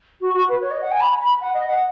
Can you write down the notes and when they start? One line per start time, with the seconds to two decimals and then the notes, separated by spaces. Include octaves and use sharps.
0.21 F#4
0.34 F#4
0.49 B4
0.61 C#5
0.71 D#5
0.82 F#5
0.92 G#5
1.01 B5
1.20 B5
1.41 F#5
1.54 D#5
1.68 F#5